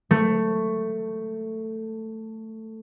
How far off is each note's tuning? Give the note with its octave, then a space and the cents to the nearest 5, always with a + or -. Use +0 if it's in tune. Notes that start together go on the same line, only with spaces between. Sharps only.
A3 +10